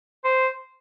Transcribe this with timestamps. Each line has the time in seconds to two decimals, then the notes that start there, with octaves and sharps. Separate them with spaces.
0.25 C5